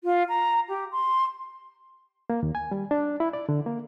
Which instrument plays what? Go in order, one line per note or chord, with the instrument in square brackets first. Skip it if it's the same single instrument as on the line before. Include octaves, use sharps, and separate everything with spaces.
[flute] F4
A#5
G4
C6
[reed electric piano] A#3
D#2
G#5
G3
D4
E4
D5
D3
A#3